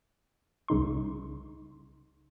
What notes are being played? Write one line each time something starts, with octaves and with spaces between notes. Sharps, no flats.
C2 C#3 D#4 C6